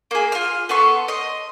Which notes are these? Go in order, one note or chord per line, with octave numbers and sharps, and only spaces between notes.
A#3 G#4
F4 F6
B3 A4 C6 C#6
D#5 C6